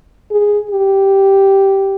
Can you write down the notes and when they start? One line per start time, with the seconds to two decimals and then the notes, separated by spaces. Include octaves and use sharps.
0.31 G#4
0.71 G4